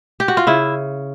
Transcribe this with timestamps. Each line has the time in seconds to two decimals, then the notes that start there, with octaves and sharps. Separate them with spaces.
0.20 G4
0.28 F#4
0.37 F4
0.47 C#3 E4